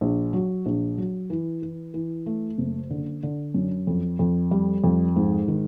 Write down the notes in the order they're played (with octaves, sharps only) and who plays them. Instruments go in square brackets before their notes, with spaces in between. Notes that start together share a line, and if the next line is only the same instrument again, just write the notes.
[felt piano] A#1
F#3
A#1
F#3
E3
E3
E3
A3
F#1
D3
D3
F#2
F2
F2
G3
F2
G#2
D#3